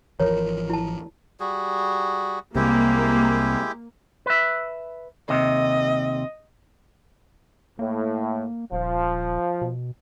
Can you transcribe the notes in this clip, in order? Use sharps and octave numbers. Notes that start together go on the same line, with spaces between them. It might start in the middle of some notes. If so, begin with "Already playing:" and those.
G#1 E3 F3 A#4 C#5
E4 A5
G3 F#4 G#4
C2 C3 G#3 A#3 E4 G4
B4 E5
D#2 C3 D#5
A2 A#3
D#1 F3
B2